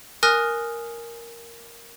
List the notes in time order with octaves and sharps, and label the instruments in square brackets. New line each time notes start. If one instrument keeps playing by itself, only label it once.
[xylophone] A#4 G#5 D#6 F6 F#6 A#6